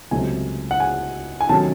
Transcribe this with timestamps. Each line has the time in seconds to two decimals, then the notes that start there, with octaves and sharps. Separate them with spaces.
0.11 C#2 C3 F#3 A3 C4 G#5
0.71 F#5
0.80 G#5
1.41 G#5
1.49 C3 D#3 F#3 A3 C#4 A5